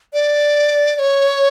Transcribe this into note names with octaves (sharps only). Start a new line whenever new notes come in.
D5
D5
C#5